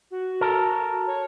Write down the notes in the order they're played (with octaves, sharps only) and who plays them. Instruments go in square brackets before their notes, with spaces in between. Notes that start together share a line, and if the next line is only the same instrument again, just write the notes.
[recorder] F#4
[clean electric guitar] A4 A#4
[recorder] C#5